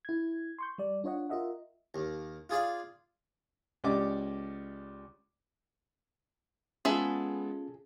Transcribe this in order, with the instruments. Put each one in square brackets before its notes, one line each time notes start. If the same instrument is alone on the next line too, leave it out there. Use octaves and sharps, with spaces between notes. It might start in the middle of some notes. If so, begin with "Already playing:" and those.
[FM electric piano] E4 G#6
C6 C#6 G6
G3 D5
D4 F4 C#5 D#5 F#5
F4 A#4 D#5 E5 F#5
[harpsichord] D#2
F4 G#4 D5 F5
[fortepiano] C#2 C#4 G4 D5 D#5 D6
[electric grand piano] G#3 B3 [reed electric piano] C#4 F4 [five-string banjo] G#4 A4 E5